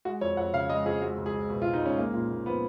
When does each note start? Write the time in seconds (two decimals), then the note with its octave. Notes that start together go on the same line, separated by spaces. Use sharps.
0.05 G#3 F#4
0.21 F2 C#5
0.37 F2 F#5
0.53 C#3 F5
0.69 G#3 D#5
0.85 F2 G#4
1.02 G#3 F#4
1.18 C#2
1.26 G#4
1.34 C#2
1.50 B2
1.62 F4
1.65 G#3
1.74 D#4
1.82 C#2 C#4
1.98 G#3 A#3
2.14 A#2
2.30 A#2
2.46 F3 B3